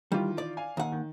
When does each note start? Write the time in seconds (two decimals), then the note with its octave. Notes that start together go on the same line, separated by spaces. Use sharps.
0.12 D#3 E3 G3 F4
0.38 D5
0.57 F5 G#5
0.77 D#2 F#5
0.92 D#3